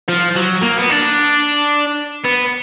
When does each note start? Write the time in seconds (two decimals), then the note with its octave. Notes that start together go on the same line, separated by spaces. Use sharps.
0.09 F3
0.36 F#3
0.63 A#3
0.78 B3
0.90 D4
2.24 B3